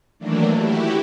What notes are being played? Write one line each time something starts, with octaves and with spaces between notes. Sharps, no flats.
D#3 E3 F#3 A3 A#3 D4
E4 F#4 G4